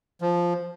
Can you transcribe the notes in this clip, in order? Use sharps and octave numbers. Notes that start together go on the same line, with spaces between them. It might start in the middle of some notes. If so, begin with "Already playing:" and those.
F3